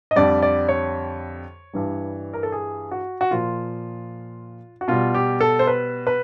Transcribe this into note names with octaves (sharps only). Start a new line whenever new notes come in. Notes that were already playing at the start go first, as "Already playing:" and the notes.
D#5
F2 D3 G3 D5
D5
C#5
G2 E3 G3
A#4
A4
G#4
F#4
F#4
A#2 F3 F4
F#4
B2 G3 F4
G4
A4
C5
B4
B4